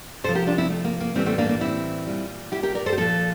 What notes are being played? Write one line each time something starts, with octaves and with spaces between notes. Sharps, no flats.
C3 F3 A4 C5
G4 A#4
D4 F4
C4 E4
A3
A#3
A#3
A2 E3 G3 A3 C4
A3 C4
A#3 D4
A#3 D4
C4 E4
A#2 G3
E4 G4
G4 A#4
A#4 D5
A4 C5
G4
A#2 F3 F4 A4